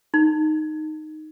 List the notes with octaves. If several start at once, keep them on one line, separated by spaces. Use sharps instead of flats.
D#4